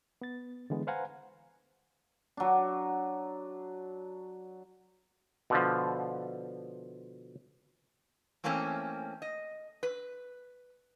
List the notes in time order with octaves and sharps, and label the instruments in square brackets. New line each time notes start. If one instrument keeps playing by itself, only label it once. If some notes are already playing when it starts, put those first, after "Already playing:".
[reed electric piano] B3 A6
D3 E3 G#3 B3
B4 C5 F5 F#5 G#5 A#5
[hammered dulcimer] F#3 D4
[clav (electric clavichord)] B2 D3 F3
[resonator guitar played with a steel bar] E3 A3 A#3 C4 C#4
D#5
B4